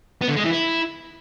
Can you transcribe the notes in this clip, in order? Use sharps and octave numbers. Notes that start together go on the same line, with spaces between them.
B3
D3
G#3
E3
E4